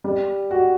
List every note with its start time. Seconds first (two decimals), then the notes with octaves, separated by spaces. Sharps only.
0.04 G3
0.51 F#4